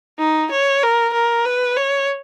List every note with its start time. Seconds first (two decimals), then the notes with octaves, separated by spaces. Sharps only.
0.19 D#4
0.51 C#5
0.83 A#4
1.14 A#4
1.45 B4
1.77 C#5